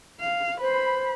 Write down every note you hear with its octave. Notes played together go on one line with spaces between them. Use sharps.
F5
B4 C5 B5